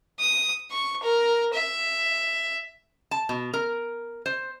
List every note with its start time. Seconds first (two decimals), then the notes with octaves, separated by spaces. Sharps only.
0.20 D#6
0.71 C#6
1.03 A#4
1.54 E5
3.11 A5
3.29 B2
3.54 A#4
4.26 C5